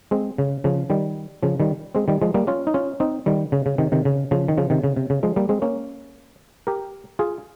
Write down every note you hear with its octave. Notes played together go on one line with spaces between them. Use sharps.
G#3 C4
C#3
C#3 F3
D#3 G3
C#3 F3
D#3 G3
G#3 C4
D#3 G3
F3 G#3
G3 A#3
C#4 F4
D#4
C#4 F4
C4 D#4
D#3 G3
C#3
C#3
C3 D#3
C3 D#3
C#3
C#3 F3
D#3
C#3 F3
C3 D#3
C#3
C3
C#3
F3 G#3
G3 A#3
G#3 C4
A#3 C#4
G4 A#4
F4 G#4